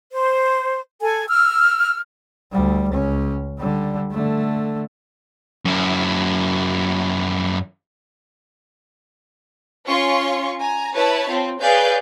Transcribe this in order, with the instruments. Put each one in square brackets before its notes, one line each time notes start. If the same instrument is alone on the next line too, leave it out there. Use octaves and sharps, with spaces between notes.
[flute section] C5
A4 G#5
E6 F6
[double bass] D2 G3
C#2 C#4
D3 G3
D3 A3
[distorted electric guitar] F#2 E4
[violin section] C#4 F4 C6 C#6
G#5 A#5
E4 B4 C#5 A5 B5
C4 F4
G#4 B4 C#5 D5 F5 G6